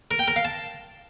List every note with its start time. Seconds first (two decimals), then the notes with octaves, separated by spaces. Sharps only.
0.11 A#4
0.19 G5
0.28 A#4
0.36 F5
0.45 A5